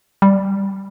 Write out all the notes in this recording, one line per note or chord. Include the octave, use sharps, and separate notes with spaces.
G3